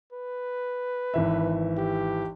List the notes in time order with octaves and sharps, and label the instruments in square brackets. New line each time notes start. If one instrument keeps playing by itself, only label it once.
[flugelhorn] B4
[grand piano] G#1 E3 E5
[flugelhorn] G4